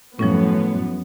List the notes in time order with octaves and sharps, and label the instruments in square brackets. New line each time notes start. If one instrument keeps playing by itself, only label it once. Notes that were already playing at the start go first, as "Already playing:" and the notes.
[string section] F#2 B3 [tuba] A2 [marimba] F3 G3 C#4